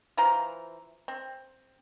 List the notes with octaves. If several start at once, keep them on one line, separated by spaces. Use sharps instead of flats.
E3 F4 C5 A#5
C4